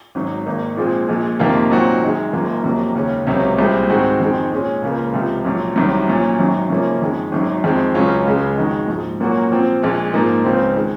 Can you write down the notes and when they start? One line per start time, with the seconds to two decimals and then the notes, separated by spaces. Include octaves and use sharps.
0.15 G#1 G#2 F#3
0.46 G#1 G#2 D#3 A#3 D#4
0.77 A#2 F3 G#3 C4
1.08 A#1 A#2 G#3
1.39 F2 C3 D#3 A#3 F4
1.71 A#2 F#3 C4 D#4 F#4
2.01 F#2 D#3 G#3
2.33 F#1 F#2 D#3 A#3 F4
2.64 F2 C3 F#3 A#3
2.95 D#2 C#3 G#3 C#4
3.27 C#2 C3 F#3 C#4
3.59 C2 A#2 G#3 C4
3.90 G#2 D#3 G#3 C4 F#4
4.20 F2 D#3 G#3 C4
4.51 A#2 G#3 C#4
4.82 C#2 C#3 F3 A#3 F4
5.13 C#2 C3 F3
5.45 A#1 A#2 F#3
5.76 C2 C3 D#3 F#3
6.07 A#1 A#2 F#3 C#4
6.39 G#1 F#2 D#3 F#3
6.70 F#2 C#3 F3 A#3 C#4
7.02 F2 D#3 G#3
7.32 G#1 F#2 D#3 F#3
7.64 F2 D#3 G#3 C4
7.94 C#2 C#3 F#3 C#4 F4
8.26 C#2 C#3 G#3
8.57 F2 D#3 G#3 D#4 F#4
8.88 A#1 G#2 F3
9.20 A#2 F#3 A#3 C#4 F#4
9.51 A#2 F3 C4
9.83 A#1 A#2 G#3
10.13 G#2 F3 A#3 D#4
10.44 C#2 C#3 F3 C4
10.76 D#3 G#3